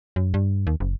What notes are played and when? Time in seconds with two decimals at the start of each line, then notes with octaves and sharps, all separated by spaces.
0.16 F#2
0.34 G2
0.67 D#2
0.80 F#1